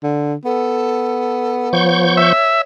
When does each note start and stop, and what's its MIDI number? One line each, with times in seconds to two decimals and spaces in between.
0.03 0.35 50
0.45 2.31 59
0.45 1.72 69
1.73 2.33 53
1.73 2.62 73
1.73 2.33 85
1.73 2.33 91
2.17 2.61 76